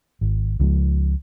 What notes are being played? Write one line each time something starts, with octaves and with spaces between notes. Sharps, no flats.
G#1
C#2 F3 G#3